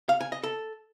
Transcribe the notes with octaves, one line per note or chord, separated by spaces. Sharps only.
F5
G#5
D#5
A4